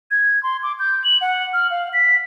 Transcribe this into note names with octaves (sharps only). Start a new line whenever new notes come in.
G#6
C6
D6
G6
F#7
F#5
F6
F5
B6